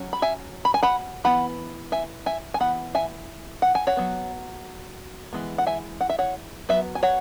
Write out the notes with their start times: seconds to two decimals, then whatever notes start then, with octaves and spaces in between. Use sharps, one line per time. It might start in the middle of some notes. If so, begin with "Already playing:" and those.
Already playing: F#3 C#4
0.13 B5
0.22 E5 G#5
0.65 B5
0.74 G#5
0.83 F#5 B5
1.24 E3 B3 F#5 B5
1.92 E5 G#5
2.26 E5 G#5
2.54 G#5
2.60 E3 B3 F#5 B5
2.95 E5 G#5
3.62 F#5
3.75 G#5
3.87 C#5 F#5
3.97 F#3 B3
5.33 E3 G#3 B3
5.58 F#5
5.67 E5 G#5
6.01 F#5
6.10 E5
6.19 C#5 F#5
6.69 F#3 B3 B4 E5
6.95 G#5
7.03 C#5 F#5